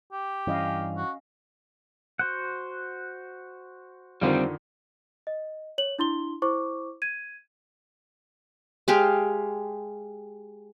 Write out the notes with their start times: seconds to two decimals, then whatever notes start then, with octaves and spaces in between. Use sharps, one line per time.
0.12 G4
0.47 G2 E3 C#4 D#5 F5
0.97 F#4
2.19 F#4 C5 F#5
4.21 F2 D3 D#3 G3 C4
5.27 D#5
5.78 C#5 F#7
5.99 D4 E4 C6 G7
6.42 E4 C5 C#6 D6
7.02 G#6 D#7
8.88 G#3 G4 F5